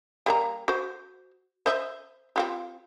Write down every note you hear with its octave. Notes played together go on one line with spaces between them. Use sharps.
G3 A#3 A#5
F#4 C5
C5 D#5 E5
C4 F4 G4